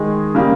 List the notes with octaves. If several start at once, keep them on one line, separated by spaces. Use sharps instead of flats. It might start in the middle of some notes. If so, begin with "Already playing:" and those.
Already playing: D#3 G#3 D#4 G#4
C#3 G3 A#3